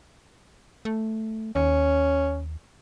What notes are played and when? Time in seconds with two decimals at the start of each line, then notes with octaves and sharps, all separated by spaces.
0.85 A3
1.55 D#2 C#4